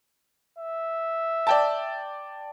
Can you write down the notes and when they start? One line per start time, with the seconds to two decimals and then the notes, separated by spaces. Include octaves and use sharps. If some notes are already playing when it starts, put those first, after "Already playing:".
0.58 E5
1.47 D5 G5 A5